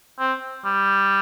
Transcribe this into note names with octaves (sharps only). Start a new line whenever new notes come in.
C4
G3